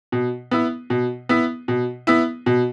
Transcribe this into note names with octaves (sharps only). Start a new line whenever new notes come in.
B2
B3 E4
B2
B3 E4
B2
B3 E4
B2